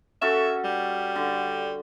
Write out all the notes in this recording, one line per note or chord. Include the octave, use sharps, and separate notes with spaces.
C#4 F#4 A4 E5
G3
D3